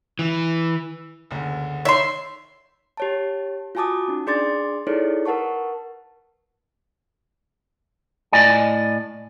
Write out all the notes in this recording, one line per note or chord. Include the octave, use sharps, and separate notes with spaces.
E3
F#1 D2
D#3 C#5 E5 C6
G4 C#5 A5
F4 F#4 G#5 A5 D6 D#6
C#4 D#4
D4 G#4 D5 C6 D6 A6
D#4 E4 G#4 A4 C#5 D5
A#4 B4 F#5 A5 C#6
A2 D5 D#5 G#5